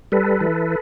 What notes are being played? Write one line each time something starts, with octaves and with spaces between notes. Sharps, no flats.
G3 A4 B4
E3